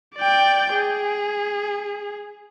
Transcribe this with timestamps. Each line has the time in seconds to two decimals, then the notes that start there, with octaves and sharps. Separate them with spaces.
0.16 D5 G5
0.74 G#4